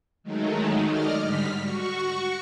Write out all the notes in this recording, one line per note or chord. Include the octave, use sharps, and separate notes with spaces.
D#3 F#3 G#3 A3 D#4
D5 D#5 F6
G#2 D3 G3 F6 B6
F#4 C#6